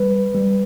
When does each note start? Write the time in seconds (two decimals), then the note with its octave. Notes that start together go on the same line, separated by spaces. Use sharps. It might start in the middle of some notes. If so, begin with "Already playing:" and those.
Already playing: G3 B4
0.35 G3